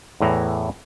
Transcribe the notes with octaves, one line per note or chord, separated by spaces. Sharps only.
E2 A2 E3 A#5